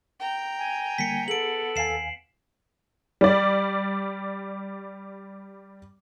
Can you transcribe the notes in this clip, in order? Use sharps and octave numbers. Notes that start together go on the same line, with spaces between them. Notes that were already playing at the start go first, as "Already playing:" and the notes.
G5 A#5
G#5
D3 G3 A#3 B6 C#7
B3 G#4 A4 D7 F#7
D#2 F5 G#5 C7 E7
G3 D5